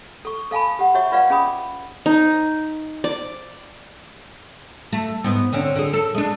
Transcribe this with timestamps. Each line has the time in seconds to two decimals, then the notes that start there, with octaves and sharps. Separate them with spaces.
0.25 A4 C#6
0.51 A4 F5 G#5 A5 B5
0.79 G4 F#5
0.94 F#4 C#5 E5 C#6
1.12 F4 B4 D5 F5 F#5
1.30 C#4 G#4 B5 D#6
2.06 D#4
3.04 D5
4.93 A3
5.24 G#2 B3
5.53 D3 C4 C#4
5.76 D3 G#4
5.93 A4
6.15 G#3 D4